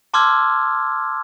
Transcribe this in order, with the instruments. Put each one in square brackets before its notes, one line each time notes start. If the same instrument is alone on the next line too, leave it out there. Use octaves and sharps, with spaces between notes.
[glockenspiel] A5 C6 D6 E6 F6 G#6